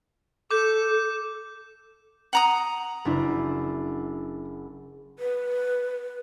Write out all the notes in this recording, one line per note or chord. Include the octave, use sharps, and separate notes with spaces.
A4 D6 G6 E7
F#5 A#5 D#6
F#1 D4 E4
B4